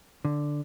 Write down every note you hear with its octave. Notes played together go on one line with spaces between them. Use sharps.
D3